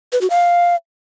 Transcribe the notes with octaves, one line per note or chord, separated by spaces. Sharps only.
B4
F#4
F5